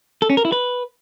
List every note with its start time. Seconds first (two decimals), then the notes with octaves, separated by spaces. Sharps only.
0.22 A4
0.30 C#4
0.37 A#4
0.45 E4
0.52 B4